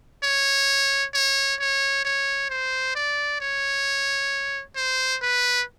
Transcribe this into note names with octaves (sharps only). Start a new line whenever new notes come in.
C#5
C#5
C#5
C#5
C5
D5
C#5
C5
B4